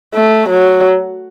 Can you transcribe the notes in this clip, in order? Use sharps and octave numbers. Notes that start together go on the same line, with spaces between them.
A3
F#3